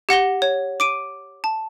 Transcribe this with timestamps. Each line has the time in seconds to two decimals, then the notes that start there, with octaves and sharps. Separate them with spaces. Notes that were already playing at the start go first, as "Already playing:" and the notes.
0.09 G4 F#5 A#6 G7
0.42 C#5
0.80 D6 D7 D#7
1.44 A5